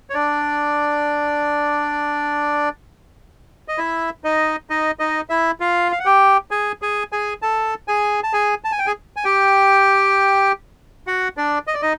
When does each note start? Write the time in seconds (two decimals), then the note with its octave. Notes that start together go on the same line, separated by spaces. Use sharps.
0.10 C#5
0.14 D4 D5
3.68 D#5
3.78 E4 E5
4.24 D#4 D#5
4.70 D#4 D#5
4.99 D#4 D#5
5.30 E4 E5
5.60 F4 F5
5.92 F5
5.99 F#5
6.05 G4 G5
6.51 G#4 G#5
6.82 G#4 G#5
7.12 G#4 G#5
7.42 A4 A5
7.88 G#4 G#5
8.23 A5
8.33 G#4 G#5
8.64 A5
8.72 G#5
8.79 G5
8.86 G#4 G#5
9.16 G#5
9.24 G4 G5
11.07 F#4 F#5
11.37 D4 D5
11.67 D#5
11.74 D5
11.82 D#4 D#5